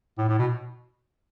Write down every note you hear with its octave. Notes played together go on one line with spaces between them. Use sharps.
A2
A2
B2